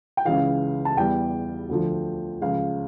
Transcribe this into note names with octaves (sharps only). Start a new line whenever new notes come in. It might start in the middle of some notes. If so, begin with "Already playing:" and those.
G5
C#2 C#3 E3 F5
A5
E2 E3 G3 G5
D2 D3 F3
C#2 C#3 F3 F5